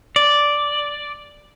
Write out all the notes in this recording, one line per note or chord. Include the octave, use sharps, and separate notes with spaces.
D5